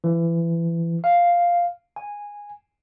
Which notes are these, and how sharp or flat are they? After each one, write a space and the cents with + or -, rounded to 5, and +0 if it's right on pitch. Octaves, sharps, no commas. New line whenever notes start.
E3 +25
F5 +0
G#5 -10